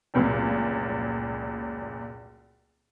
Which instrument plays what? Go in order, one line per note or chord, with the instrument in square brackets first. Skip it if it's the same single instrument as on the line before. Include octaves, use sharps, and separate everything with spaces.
[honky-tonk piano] F1 C#2 A#2 F#3